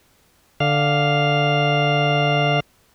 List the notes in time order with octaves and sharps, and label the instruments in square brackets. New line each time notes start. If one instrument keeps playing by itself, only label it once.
[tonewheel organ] D3 F5